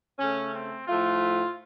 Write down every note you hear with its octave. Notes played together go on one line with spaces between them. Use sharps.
C#3 A3 C#4
C4
A2 F3 A3 F4